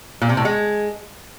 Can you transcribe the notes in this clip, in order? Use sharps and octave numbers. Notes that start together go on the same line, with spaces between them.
A#2
C3
A2
G#3